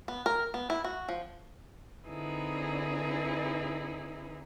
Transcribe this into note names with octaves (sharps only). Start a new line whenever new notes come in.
B3
A#4
B3
E4
F#4
F3
D3 C4 D#4 E4 G#4 B4